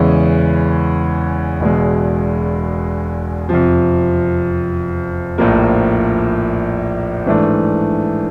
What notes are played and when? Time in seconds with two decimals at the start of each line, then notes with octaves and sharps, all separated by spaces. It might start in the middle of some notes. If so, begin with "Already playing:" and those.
Already playing: E2 C#3 E3 G#3 C#4
1.60 E1 E2 B2 G#3
3.49 F2 C3 F3
5.38 A#1 A2 F3 A#3
7.26 G#2 E3 A3 D4